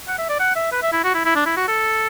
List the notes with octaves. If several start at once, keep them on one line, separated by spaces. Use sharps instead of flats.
F#5
E5
D5
F#5
E5
B4
E5
E4
F#4
E4
E4
D4
E4
F#4
A4